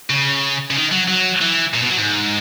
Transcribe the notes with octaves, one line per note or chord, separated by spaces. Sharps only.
C#3
C#3
D#3
F#3
F#3
E3
A#2
B2
F#3
G#2